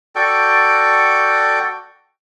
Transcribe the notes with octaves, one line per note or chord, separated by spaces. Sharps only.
F#4 A4 D5 G5